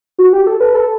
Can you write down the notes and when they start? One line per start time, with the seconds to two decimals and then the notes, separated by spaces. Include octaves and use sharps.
0.18 F#4
0.33 G4
0.47 A4
0.60 B4
0.74 A4